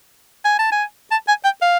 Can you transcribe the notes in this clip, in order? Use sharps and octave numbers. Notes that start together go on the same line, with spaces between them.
G#5
A5
G#5
A5
G#5
G5
F5